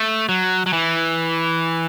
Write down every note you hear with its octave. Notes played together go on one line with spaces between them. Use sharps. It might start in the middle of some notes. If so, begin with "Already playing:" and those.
Already playing: A3
F#3
F#3
E3